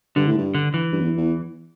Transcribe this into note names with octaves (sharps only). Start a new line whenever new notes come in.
G2 D3
A2
G2
D3
E3
G2
E2
E2